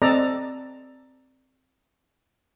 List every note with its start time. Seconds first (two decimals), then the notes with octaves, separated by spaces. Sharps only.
0.02 C4 A4 D5 D#5 A#5